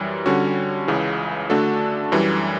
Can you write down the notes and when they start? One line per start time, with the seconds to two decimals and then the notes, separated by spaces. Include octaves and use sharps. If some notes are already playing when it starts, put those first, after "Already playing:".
Already playing: F#2 E3 G3
0.26 D3 G3 C#4 F#4
0.88 C#2 C#3 E3
1.50 D3 A3 D4 F#4 A4
2.12 F#2 E3 G3